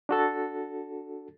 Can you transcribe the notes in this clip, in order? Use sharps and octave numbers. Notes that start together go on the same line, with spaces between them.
D4 F#4 A4